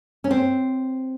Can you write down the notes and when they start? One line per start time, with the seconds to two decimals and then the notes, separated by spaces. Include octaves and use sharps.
0.24 C#4
0.31 C4